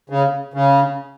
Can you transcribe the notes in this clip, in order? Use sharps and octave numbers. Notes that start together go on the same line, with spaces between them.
C#3
C#3